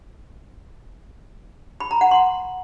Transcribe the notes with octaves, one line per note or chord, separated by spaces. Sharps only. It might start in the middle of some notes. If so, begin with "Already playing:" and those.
B5
A#5
F#5
C6